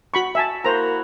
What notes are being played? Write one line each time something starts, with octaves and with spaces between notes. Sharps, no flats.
F#4 B5 C#6
E5 G#5 A5
A#3 E4 F#4 C5 A#5